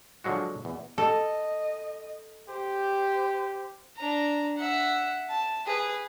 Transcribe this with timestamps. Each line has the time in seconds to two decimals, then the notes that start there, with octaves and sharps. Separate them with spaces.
0.24 D3 F3 F#3 G#3 F#4
0.65 E2
0.98 A4 D#5
2.49 G4 C5
3.97 D4 A#5
4.57 E5 F#5
5.29 A5
5.66 G#4 B4